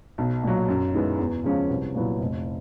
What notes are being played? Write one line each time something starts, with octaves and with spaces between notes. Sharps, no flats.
B1
A#2 F#3
F#2
D#3 G#3 B3 E4
E2
C#3 F3 G#3 C#4
C2
A#2 F#3 B3 E4
F1